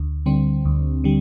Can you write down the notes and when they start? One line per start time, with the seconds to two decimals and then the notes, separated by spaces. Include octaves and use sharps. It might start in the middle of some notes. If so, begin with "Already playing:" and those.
Already playing: D2
0.26 D3 G3 C4
0.65 D2
1.04 D3 G3